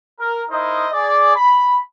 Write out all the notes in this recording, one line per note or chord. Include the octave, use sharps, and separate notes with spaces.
A#4
D#4 E4 A#4 C5 D#5
G#4 D5
B5